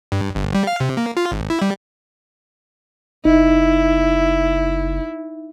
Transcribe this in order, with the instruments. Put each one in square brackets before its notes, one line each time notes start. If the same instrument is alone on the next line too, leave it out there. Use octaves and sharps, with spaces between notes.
[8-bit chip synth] G2
G1
G3
F5
C3
A#3
F4
G#1
E4
G3
[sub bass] F#1 [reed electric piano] D#4 [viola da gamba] E4